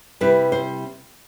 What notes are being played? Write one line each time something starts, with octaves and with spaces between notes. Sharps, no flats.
C3 G3 C4 E4 B4
C5